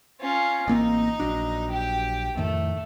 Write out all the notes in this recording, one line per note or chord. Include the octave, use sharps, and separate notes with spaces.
C#4 F4
A1 A#3 C4 D#4
A#1 F#3 D4
G4
F2 A2 D#3 A3